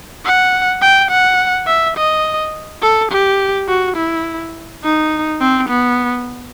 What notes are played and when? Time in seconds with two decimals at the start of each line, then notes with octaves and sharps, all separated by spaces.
0.25 F#5
0.82 G5
1.10 F#5
1.67 E5
1.97 D#5
2.82 A4
3.12 G4
3.68 F#4
3.96 E4
4.84 D#4
5.40 C4
5.69 B3